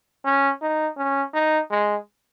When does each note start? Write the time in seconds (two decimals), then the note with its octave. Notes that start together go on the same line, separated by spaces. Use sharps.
0.24 C#4
0.62 D#4
0.97 C#4
1.34 D#4
1.70 G#3